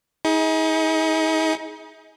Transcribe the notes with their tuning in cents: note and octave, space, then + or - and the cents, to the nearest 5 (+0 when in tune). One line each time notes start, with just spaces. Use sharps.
D#4 +40 G#4 +10